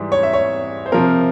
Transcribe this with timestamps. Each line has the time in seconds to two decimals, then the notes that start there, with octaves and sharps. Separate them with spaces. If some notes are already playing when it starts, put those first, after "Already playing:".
Already playing: G#2 E3 G3
0.12 C#5
0.23 E5
0.33 C#5
0.86 C5
0.92 C3 F3 C4 A#4